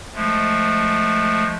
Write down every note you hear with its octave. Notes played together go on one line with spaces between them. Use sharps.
F3 G#3 A3